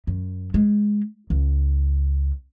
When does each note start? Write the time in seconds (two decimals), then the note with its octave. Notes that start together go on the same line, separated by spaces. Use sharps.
0.07 F#2
0.54 G#3
1.30 C#2